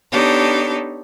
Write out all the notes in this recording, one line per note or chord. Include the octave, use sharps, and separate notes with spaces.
B3 D4 D#4 G4 A4 C#5